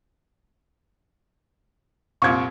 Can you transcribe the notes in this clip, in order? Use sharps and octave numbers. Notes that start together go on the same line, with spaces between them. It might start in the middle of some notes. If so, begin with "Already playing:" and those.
C2 F2 A#2 C#6 G#6